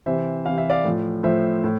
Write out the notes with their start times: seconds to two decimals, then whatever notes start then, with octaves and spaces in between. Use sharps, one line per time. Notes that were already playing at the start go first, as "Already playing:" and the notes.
0.06 C3 E3 C5 E5
0.45 C3 E3 F5
0.58 E5
0.70 D5 F5
0.85 A2 F3
1.23 A2 F3 C5 E5
1.64 A2